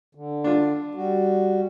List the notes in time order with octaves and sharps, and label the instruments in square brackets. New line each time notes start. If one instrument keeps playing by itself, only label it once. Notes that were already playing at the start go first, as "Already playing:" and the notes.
[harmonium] D3
[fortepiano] D4 F4
[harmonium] G3 F#4